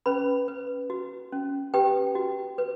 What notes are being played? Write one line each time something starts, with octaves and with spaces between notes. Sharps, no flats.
C#4 B4 B5
B4
F#4
C#4
G4 B4 G5
F#4
B4